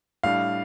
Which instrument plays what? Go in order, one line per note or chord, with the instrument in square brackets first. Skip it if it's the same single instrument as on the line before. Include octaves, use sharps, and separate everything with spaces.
[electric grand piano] A2 G3 D4 [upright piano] F5